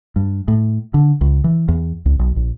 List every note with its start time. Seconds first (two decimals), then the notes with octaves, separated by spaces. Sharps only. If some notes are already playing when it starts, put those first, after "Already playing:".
0.16 G2
0.48 A2
0.94 D3
1.21 C#2
1.44 E3
1.68 E2
2.06 C#2
2.19 B1
2.36 A#1